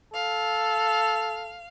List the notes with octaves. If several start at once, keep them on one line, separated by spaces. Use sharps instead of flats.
A4 F5